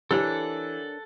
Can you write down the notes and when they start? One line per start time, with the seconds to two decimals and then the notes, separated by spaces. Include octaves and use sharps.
0.11 E3 D4 G4 A4 A#4 C#5 F#5